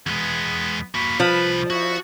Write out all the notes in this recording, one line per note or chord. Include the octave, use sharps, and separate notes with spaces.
E2 G#3 B3
A#3 F#4 B5
C2 F3 B4 B5
E4 F#4